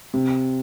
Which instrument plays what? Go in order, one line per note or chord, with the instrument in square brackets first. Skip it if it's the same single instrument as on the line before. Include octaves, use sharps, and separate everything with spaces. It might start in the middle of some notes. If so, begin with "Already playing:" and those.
[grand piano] C3